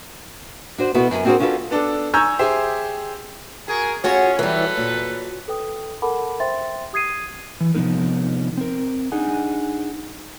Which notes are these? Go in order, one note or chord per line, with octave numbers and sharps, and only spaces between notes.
D4 F#4 C5
B2 B3 E4 F#4 A4 B4
F#2 G#5
C4 D4 F#4 G#4 A#4 C5
C#4 D4 F4 F#4 A4 B4
B3 D4 A4
G#5 A#5 C#6 E6 G6 G#6
G4 G#4 C5 E5
F#4 G#4 A#4 G#5
C#4 F4 F#4 G#4 C#5
E3 F#3 G3 A4 B4
A#2
A4 B4 G5 D#6
A4 A#4 F#5 A5 B5 D6
C5 E5 G5 C6 A6
G4 D#6 G#6 C7 D#7
E3
C3 F3 G#3 B3 D#4 A#4
C4 A#4
D4 D#4 G#4 F#5 G#5